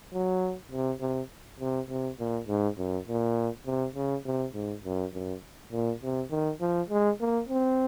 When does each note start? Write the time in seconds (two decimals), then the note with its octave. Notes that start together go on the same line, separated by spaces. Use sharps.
0.14 F#3
0.72 C3
1.01 C3
1.60 C3
1.90 C3
2.20 A#2
2.48 G#2
2.78 F#2
3.08 A#2
3.67 C3
3.96 C#3
4.26 C3
4.54 G#2
4.85 F#2
5.14 F#2
5.73 A#2
6.02 C3
6.31 D#3
6.61 F3
6.90 G#3
7.21 A#3
7.49 C4